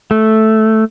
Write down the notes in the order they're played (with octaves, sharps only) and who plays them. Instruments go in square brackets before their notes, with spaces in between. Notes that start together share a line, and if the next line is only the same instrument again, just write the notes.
[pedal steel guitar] A3